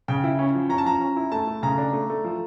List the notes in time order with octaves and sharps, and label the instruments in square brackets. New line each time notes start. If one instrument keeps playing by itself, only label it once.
[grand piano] C#3 [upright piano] G5
[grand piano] E4
C#4
F3
[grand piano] C#4 [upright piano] A#5
[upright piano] A5
[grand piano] F3 [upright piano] A#5
[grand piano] C#4
E4
[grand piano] A3 [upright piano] A5
[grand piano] A3
[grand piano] C#3 [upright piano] A#5
[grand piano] D4
A3
A3
F3